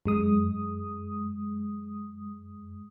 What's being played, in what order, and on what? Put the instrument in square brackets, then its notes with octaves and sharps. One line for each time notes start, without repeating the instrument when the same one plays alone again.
[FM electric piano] F#2 G#3 D#6